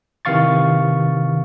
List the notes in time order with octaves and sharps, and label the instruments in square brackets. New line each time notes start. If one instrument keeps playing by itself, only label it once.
[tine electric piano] C3 D#3 E3 F5 C#6 A6